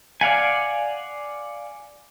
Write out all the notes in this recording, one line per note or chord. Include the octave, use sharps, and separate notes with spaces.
D5 F5 F#5 G#5